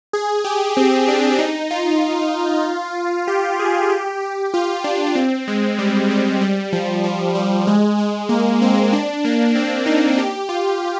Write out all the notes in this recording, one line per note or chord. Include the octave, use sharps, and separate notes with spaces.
G#4
G4
C4
D4
D#4
F4
G4
G#4
G4
G4
F4
D4
C4
G#3
G3
G3
G3
F3
F3
G3
G#3
G#3
A#3
C4
D4
A#3
C4
D#4
G4
F4